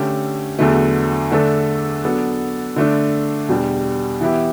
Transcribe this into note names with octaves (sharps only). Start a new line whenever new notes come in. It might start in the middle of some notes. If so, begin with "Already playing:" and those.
Already playing: D3 A3 C#4 G4
E2 D3 F#3 A3
D3 A3 D4 A4
F#3 B3 D4 A4
D3 A3 D4
E2 B2 G3 D4 G4
E3 B3 E4 G4